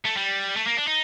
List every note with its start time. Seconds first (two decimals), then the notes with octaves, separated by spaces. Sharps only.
0.05 A3
0.16 G3
0.56 A3
0.67 A#3
0.77 D4
0.87 D#4